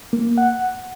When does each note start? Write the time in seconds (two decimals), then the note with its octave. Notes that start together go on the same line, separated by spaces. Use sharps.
0.13 A#3
0.38 F#5